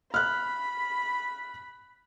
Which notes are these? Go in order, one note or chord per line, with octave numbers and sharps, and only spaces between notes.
B5 F6 F#6